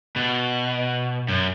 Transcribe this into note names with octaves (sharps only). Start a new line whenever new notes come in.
B2
F#2